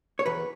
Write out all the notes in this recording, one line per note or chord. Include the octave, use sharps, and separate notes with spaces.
C#5
E2 B4